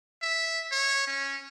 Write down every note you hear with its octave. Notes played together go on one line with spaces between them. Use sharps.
E5
C#5
C#4